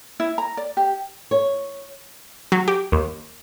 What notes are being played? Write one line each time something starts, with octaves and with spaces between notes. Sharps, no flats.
E4
A#5
D5
G4
C#5
F#3
G4
D#2